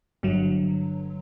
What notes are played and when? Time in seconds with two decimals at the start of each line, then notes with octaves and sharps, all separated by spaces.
0.23 G1 G2 D3 F#3